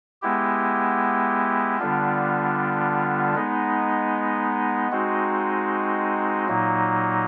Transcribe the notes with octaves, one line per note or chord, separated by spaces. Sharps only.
G#3 B3 E4 G4
D3 G3 B3 D4 F4
G#3 B3 D#4
G#3 C4 D#4 F#4
A#2 F#3 A#3 D#4